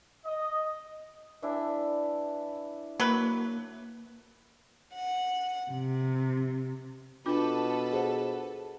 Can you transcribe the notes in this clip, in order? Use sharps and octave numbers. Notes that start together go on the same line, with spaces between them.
D#5
E3 D4 E4
F#3 A#3 B4
F#5
C3
B2 D4 F4 A4 B4 D6
G#4 C5 F#5